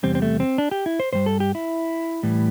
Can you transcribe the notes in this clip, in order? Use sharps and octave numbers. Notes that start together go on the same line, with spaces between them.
E2 C3 G3 C4
C4
A3
C4
D4
G4
E4
C5
G2 G3 C5
A4
G4
E4
A2 E3 G3